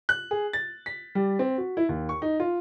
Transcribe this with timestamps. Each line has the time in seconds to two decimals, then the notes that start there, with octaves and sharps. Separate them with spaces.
0.09 F#6
0.31 G#4
0.53 A6
0.86 B6
1.15 G3
1.39 C4
1.58 F#4
1.77 E4
1.89 D#2
2.09 C#6
2.22 D#4
2.40 F4